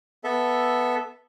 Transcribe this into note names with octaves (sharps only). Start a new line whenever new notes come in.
B3 A4 E5